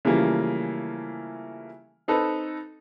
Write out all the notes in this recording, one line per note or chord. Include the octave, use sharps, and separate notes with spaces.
C#3 E3 F3 G3 A3 A#3
C4 D#4 A4 B4 A5